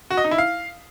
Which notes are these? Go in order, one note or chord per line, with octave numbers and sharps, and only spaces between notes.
F#4
D#5
D#4
E4
F5